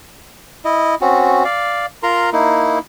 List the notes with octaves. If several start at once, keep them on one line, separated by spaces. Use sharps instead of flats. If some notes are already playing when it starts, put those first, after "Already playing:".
E4 D#5
C4 C#4 F#4
D5 F5
F4 A#4 A#5 C6
A#3 D#4 E4